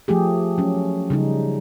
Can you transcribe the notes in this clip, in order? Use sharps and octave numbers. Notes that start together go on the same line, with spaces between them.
F3 A3 G4 G#4
F#3 C#4
C#3 G3 D#4